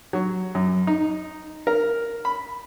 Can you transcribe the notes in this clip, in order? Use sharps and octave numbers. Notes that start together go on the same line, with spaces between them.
F#3
F#2
D#4
A#4
B5